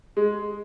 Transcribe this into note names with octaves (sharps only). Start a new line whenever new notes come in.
G#3